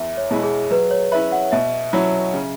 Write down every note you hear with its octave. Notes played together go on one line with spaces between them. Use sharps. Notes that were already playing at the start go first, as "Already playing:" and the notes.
Already playing: E2 E5
C#5
B2 G#3 E4
G#4
F#3 B4
C#5
C#4 E4 B4 E5
F#5
B2 E5
F#3 C#4 E4
C#3